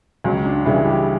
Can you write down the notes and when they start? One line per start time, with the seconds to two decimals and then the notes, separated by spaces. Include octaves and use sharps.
0.24 C#2 F#3
0.46 D4
0.65 C#3 E3 G3 E4
0.85 G4